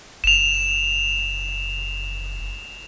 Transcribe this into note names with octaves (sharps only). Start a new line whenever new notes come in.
F#1 E7 F7